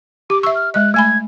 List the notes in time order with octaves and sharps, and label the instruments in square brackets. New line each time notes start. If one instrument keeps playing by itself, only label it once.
[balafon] G4 [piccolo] D6
[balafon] E5 C#6 [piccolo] E6
[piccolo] F6
[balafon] G#3 D#5 [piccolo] F#6
[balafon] A3 G#5 B5 [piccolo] G#6